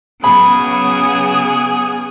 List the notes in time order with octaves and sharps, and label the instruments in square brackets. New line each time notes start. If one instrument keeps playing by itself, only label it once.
[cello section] C#3 F#3 B3 [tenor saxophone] G#4 [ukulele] B5